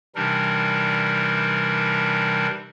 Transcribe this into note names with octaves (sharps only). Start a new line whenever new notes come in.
C3 E3 G3 D4 D#4 A#4